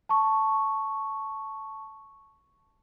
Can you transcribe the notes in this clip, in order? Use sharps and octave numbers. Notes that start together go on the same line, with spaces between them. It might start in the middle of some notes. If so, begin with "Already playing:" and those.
A5 C#6